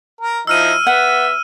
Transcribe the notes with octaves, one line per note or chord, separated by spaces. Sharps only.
A#4
F3 D#4 E4 E6 F6 D#7
B3 E5 F#5